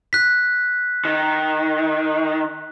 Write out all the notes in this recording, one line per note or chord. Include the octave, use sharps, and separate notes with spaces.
F#6 B6
D#3